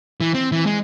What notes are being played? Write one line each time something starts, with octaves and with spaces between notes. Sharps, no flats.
E3
C4
E3
G#3